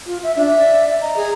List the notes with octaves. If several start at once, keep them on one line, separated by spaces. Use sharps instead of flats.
F4
E5
D4 E5
D5
D#5 A#5
G#4